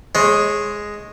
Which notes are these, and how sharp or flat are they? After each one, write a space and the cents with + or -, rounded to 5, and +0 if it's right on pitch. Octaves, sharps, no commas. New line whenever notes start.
G#3 +0 C#5 -30